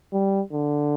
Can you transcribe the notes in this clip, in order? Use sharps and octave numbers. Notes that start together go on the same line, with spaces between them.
G3
D3